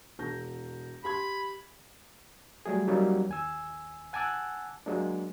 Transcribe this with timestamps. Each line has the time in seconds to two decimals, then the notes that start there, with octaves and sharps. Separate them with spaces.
0.19 E1 G6 A#6
1.04 G4 B5 C6 G#6
2.66 F#3 G3 A3 G#4
2.87 F#3 G3 A#3 C#4 D#4
3.29 D#2 G#5 E6
4.13 F#5 G#5 A5 D6 E6 F#6
4.86 F#3 G#3 A#3 D4